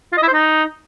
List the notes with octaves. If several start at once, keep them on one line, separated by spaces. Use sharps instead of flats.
F4
D#5
E4
C5
D#4